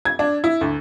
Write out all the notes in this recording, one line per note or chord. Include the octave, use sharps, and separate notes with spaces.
G#6
D4
E4
D2